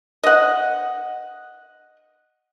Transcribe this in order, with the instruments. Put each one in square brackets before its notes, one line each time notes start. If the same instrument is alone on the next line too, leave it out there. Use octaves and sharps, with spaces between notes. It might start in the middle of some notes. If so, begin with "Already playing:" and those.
[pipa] D#5 F#5